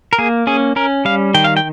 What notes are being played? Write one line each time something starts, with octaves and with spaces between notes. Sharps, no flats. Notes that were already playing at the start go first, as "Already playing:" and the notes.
A#4
A#3 G#4
C#4 G#4
C#4 A#4
G3 F5
D#3 G5
F5
G5